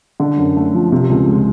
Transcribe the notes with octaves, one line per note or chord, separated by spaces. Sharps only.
D3
F#2
A3
F3
C3
C#2
G#3